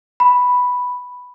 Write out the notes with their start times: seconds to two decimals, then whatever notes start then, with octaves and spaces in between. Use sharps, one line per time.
0.20 B5